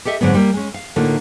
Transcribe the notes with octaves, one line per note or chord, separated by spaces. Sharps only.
G4 A4 D#5 E5
G#2 D3 F#3 B3
G3 A#3
G#3 C#4
F5
A2 D3 A#3 D#4 F4